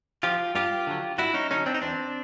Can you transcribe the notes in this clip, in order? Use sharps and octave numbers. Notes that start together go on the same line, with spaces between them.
F3 F4 G4
G2 F4 G4
D3 F#3
G2 E4 F#4
C#4 D#4
D3 F#3 C#4 D#4
C4 D4
D#4
E2 C4 D4